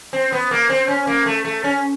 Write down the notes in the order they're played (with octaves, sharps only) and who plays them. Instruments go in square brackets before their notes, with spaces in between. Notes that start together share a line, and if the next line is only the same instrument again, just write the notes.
[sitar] C4
B3
A#3
C4
C#4
A#3
A3
A3
C#4